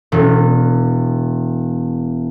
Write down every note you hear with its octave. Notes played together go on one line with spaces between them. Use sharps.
E1 B2 C#4 A4